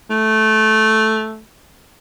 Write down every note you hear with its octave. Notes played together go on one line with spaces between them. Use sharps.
A3